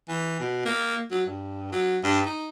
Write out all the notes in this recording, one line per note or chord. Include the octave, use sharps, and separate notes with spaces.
E3
B2
A#3
F#3
G2
F#3
G2
D#4